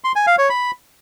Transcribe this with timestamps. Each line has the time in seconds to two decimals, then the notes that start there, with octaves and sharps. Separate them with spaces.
0.04 C6
0.16 G#5
0.27 F5
0.38 C#5
0.50 B5